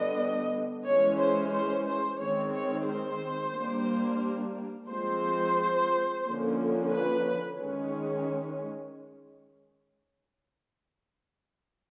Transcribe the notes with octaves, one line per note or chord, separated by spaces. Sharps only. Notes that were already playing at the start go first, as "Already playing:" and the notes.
Already playing: D3 G3 B3 D4 D#5
E3 G#3 C#4 C#5
C5
C5
C5
D#3 G#3 C4 C#5
C#5
C5
G3 A#3 D4
F3 G#3 C4 C5
D3 F3 A#3 C#4
B4
D#3 G#3 C#4